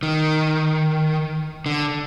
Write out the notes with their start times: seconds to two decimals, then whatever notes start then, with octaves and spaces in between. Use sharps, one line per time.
0.03 D#3
1.66 D3